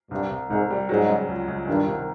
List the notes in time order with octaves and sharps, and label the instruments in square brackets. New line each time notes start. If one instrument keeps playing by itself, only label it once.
[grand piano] C2 [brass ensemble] G2
[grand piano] C2
[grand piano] C2 [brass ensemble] G#2
[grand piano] G3
[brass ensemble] G#2 [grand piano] F#3
[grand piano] C#3
C#2
C#2
[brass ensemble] G2 [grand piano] D#3
[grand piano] C2